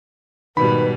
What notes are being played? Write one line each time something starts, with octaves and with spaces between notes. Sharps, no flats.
G#2 B2 D#3 G3 B4 B5